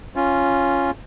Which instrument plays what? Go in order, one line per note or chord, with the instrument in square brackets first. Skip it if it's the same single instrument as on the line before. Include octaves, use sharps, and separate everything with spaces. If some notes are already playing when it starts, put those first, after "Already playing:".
[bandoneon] C#4 F4